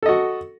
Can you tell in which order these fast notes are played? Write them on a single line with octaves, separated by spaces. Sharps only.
A4 D#5 F#4